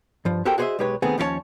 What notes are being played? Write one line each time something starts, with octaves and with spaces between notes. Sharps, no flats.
G2 F3
F#4 G4 A4 A#4 C5 G5
F#4 G#4 C5 C#5 D#5 E5
B1 G#3 G4 B4 C#5
D#3 A3 B3 C4 G#4
D#2 F3 C#4 F4 C#5 A5